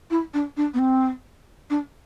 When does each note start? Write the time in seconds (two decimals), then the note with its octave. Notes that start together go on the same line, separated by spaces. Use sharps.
0.11 E4
0.34 D4
0.57 D4
0.74 B3
0.79 C4
1.70 D4